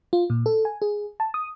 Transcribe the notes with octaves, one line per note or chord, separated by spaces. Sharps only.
F4
A#2
A4
G#5
G#4
A5
D#6